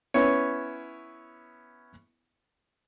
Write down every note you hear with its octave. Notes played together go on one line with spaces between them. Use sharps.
B3 C#4 E4 C#5